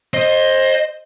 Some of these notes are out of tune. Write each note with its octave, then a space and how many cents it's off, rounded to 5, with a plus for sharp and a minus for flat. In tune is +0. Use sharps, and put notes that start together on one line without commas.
C5 +20 D#5 +0